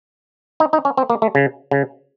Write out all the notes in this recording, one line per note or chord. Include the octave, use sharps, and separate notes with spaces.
D#4
D#4
C#4
C4
A#3
A3
C#3
C#3